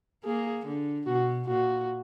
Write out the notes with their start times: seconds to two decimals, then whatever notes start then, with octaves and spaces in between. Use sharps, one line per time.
0.24 A#3 G#4
0.66 D3
1.07 B2 F#4
1.48 A#2 F#4